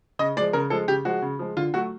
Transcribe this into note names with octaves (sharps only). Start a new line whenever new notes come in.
C#3 D#5
F3 G#3 D5
C#3 A#4
F3 G#3 A4
C#3 G4
F3 G#3 F#4
C#3
F3 G#3
D3 F4
F#3 A3 F#4